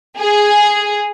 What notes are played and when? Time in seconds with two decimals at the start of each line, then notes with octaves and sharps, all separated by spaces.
0.18 G#4